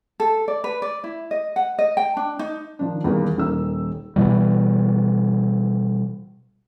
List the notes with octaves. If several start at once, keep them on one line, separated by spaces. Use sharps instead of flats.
A4
D5
B4
D5
E4
D#5
F#5
D#5
G5
D4
D#4
D#3 F3 D4
E2 D#3 G3 A#3
D#1 D#3 E6
B2 E3 G3